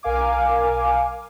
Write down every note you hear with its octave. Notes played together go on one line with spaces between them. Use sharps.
B1 A#4 F5 G#5 D6